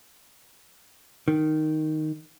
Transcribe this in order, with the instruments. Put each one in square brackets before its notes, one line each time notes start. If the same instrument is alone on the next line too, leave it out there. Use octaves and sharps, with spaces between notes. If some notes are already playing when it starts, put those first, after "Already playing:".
[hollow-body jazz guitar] D#3